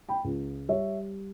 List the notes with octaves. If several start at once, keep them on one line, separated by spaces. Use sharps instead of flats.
G5 B5
C#2
G3 C#5 E5